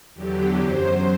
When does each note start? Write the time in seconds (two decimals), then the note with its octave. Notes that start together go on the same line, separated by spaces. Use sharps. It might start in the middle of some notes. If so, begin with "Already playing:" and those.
0.15 E2 D3 F#3 G4
0.61 F#2 F#3 C5